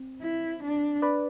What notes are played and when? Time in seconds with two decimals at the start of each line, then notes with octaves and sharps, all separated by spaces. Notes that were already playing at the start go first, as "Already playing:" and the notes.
Already playing: C4
0.21 E4
0.63 D4
1.02 B4 D5